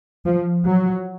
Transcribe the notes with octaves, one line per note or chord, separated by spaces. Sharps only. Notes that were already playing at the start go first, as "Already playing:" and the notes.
F3
F#3